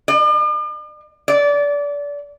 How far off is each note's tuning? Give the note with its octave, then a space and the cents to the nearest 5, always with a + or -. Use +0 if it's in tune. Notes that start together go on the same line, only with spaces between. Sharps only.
D5 +45
D5 -25